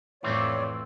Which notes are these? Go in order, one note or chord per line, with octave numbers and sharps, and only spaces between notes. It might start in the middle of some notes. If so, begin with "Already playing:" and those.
F2 A2 E3 A3 C4 C#5 D5